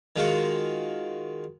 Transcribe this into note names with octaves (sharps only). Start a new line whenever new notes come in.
D#3 G#3 F4 F#4